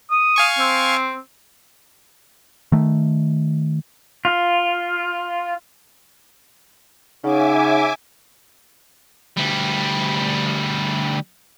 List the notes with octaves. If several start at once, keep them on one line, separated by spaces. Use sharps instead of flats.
D#6
F5 G#5 C#6
C4
D#3 A3
F4
C#3 D#4 E5 F#5 G#5 D6
D2 G3